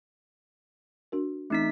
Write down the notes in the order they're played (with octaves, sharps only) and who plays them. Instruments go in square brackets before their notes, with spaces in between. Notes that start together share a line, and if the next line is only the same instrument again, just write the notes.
[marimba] D4 F#4 A#4
[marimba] E3 C4 C#4 [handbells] A3 D#4 B6